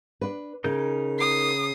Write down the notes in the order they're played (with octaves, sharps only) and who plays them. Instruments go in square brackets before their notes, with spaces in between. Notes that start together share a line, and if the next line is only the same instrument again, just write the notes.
[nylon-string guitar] D4 B4
[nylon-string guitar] C#3 [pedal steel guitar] D#4 A#4 G6
[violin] D#6 C7